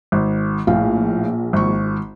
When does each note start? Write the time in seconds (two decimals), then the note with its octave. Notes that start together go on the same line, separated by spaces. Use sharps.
0.12 G#1
0.67 A#1 A2 F5
1.53 G#1 C#6